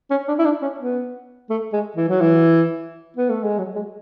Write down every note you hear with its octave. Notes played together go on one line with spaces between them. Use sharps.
C#4
D4
E4
D4
C#4
B3
A3
G#3
E3
F#3
E3
B3
A3
G#3
F#3
G#3